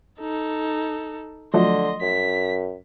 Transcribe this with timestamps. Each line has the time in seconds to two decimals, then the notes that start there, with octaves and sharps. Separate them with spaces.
0.20 D#4 A4
1.54 D3 F3 F#3 A3 D#5 C6
2.01 F#2 B6